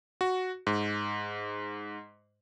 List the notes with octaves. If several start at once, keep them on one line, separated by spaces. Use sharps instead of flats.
F#4
G#2